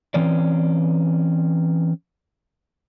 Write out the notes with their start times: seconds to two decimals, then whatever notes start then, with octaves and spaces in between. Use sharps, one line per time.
0.14 E3 C4 C#4 D5